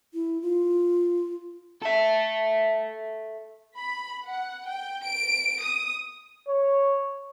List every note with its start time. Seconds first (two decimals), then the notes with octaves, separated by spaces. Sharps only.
0.14 E4
0.42 F4
1.82 A4 E5
3.78 B5
4.25 F#5
4.68 G5
5.05 D7
5.61 D#6
6.48 C#5